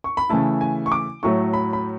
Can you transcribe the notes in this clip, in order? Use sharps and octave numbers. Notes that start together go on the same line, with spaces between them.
C#6
B5
C#3 E3 A3 E4 A5
G#5
C#6
D6
A2 F#3 A3 C#6
B5
B5